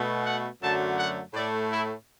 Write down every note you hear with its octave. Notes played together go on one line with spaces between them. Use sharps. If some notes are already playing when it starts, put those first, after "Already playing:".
Already playing: B2 A3
F#5
F#2 D3 F#3 A3 A5
F#5
A2 A3 D5
E4